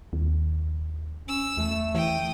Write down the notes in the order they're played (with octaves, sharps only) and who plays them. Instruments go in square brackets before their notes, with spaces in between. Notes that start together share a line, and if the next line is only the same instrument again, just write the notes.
[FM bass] D#2
[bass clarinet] C#4 [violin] E6
[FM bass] E2 [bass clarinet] A3
[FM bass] E3 [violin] G5 D#6